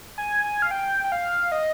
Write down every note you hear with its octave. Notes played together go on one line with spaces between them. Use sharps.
G#5
G#5
F5
G5
G5
F5
D#5